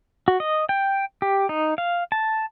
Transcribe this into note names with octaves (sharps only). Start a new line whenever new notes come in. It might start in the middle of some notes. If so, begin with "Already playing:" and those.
F#4
D#5
G5
G4
D#4
F5
A5